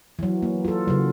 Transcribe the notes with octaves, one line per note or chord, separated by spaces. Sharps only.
E3 F#3
A#3
F4 A4
C#3 F#3